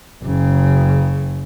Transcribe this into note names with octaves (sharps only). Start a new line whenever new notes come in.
F#1 C#3